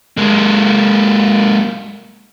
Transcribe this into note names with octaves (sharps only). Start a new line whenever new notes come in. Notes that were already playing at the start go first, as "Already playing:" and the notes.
G#3 A#3